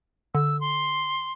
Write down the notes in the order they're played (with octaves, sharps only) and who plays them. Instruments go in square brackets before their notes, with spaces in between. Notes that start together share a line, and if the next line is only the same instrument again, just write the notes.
[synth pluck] D3 [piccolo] E6
[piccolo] C6